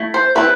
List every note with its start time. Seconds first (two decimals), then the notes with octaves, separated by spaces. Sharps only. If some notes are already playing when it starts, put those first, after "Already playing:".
Already playing: A3 E4
0.14 C5
0.35 G3 C4 E4 B4